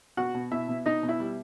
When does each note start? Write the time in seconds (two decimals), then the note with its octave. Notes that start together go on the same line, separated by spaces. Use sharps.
0.17 B2 F#4 F#5
0.34 B2
0.51 B2 E4 E5
0.69 B2
0.86 B2 D#4 D#5
1.03 B2
1.09 E4 E5
1.20 G3